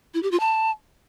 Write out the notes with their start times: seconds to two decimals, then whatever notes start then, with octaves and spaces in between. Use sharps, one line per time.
0.14 E4
0.23 G4
0.31 F4
0.40 A5